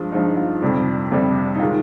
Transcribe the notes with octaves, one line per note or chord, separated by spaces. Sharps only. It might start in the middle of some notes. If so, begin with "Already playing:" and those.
Already playing: G2 F3 G#3 F4
G2 F3 G#3 D#4
F4
F2 C3 G3
F2 C3 G3
D#4
D#3 G#3 F4